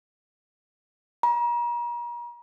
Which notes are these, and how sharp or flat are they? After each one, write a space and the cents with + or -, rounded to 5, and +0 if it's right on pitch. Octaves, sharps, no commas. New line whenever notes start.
A#5 +40